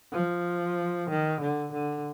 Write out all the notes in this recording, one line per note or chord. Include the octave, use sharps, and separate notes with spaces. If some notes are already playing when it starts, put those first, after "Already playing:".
F3
D#3
D3
D3